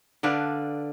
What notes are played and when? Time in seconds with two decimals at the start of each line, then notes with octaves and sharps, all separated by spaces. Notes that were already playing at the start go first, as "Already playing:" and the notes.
0.23 D3 D4 B4 F5